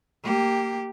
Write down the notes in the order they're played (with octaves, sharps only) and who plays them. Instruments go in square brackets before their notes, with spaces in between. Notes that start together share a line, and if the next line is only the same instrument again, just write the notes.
[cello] A#3 G4